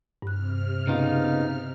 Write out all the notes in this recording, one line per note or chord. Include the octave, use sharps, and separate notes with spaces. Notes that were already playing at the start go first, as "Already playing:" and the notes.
G2 C3 F6 F#6
C#3 B3 D#4 F4